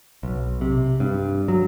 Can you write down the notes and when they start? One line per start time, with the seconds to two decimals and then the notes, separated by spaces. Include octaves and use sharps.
0.23 B1
0.61 C3
1.00 G2
1.48 F#3